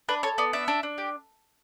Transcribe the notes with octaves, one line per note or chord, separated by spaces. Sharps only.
D4 B4
A4 C#5
B3 D5
D4 E5
D4
D4
G4